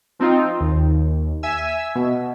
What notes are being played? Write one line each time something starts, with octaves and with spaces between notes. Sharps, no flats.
F3 C4 D#4 F4
D#2
E5 G#5 E6
B2